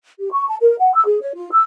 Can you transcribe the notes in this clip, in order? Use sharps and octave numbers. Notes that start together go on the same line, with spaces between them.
G4
C#6
A5
A#4
F#5
E6
G#4
C#5
F4
E6